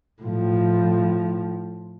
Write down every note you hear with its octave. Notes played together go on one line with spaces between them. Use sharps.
A2 F3